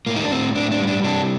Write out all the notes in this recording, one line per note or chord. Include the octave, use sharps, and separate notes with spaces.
A2 A#3
D#4
D4
A2 C4
A2 D4
D4
G3
D4
C3 D4